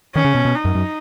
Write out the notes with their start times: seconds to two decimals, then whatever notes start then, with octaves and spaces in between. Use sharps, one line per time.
0.15 D#3 C#4
0.25 C#3
0.35 B2
0.45 B2
0.55 D#4
0.65 F#2
0.75 F#2